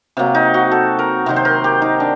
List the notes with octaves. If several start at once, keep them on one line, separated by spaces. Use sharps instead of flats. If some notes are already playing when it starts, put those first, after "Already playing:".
C3 F#3 A#3
D#4
F#4
A4
A#4
C3 D#3 F#3 C5
C5
A#4
G4
D#4
D4